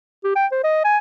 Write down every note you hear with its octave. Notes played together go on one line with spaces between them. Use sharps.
G4
G5
C5
D#5
G#5